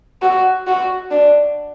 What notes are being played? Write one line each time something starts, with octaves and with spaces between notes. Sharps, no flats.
F#4
F#4
D4